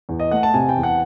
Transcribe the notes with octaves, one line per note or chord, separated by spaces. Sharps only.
E2
D#5
A3 F#5
A5
C3 G#5
G5
E2
F#5